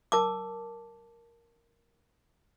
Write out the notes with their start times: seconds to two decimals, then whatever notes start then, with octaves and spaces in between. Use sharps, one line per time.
0.12 A#4 A5 D6